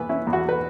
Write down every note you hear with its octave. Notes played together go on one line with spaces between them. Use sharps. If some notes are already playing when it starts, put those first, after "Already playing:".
Already playing: E2 E3 B3 B4
C#4 E4
E2
F#4
B4